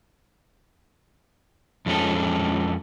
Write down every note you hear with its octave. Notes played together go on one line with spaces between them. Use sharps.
F2 G#3 C#4 A4